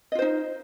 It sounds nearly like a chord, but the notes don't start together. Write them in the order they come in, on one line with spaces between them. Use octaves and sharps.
D#5 F4 C5 D#4